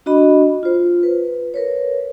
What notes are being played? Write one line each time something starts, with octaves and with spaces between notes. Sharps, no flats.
D4 F#4 D#5 B5
F4 C5
B4
A#4 B4 C#5